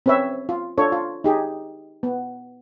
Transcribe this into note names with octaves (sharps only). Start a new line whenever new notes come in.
C4 C#4 B4 C#5 E5
F4
D4 F4 A4 C#5
F4
D#4 G4 G#4
B3